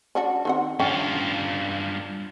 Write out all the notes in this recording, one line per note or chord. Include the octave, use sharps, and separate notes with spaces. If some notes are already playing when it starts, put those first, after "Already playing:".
C#4 D4 F#4
D#3 C4 F#5
G2 C#4 F4 G5